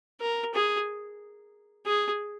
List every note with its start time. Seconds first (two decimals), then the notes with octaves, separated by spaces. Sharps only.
0.20 A#4
0.54 G#4
1.85 G#4